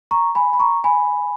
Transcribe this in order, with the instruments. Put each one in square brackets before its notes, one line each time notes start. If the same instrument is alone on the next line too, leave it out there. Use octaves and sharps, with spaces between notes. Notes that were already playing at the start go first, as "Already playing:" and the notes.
[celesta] A#5 C#6
G#5 B5
B5
A#5 C#6
G#5 B5